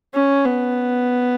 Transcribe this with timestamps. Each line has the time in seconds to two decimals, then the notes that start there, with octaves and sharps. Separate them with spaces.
0.15 C#4
0.45 B3